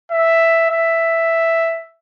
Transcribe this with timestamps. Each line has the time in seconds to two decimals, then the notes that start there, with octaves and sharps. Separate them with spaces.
0.11 E5
0.70 E5